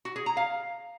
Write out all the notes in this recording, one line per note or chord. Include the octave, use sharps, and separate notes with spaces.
F#4
G#4
A#5
F5